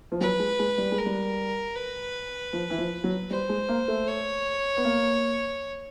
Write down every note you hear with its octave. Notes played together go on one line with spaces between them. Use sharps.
F3
F#3 B4
G#3
G#3
G3
G#3
A#4
G3
B4
F3
E3
F3
F#3
G3 C5
G#3
A#3
A3
C#5
B3
A#3